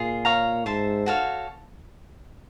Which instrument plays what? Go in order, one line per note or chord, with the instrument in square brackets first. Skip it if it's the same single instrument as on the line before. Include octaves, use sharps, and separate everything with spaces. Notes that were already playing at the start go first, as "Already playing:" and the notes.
Already playing: [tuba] A#2 [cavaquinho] F4 G#4
[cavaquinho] C#5 F5 A#5
[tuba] G#2 [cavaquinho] C5 E5 A5
[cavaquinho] F#4 A4 C#5 F5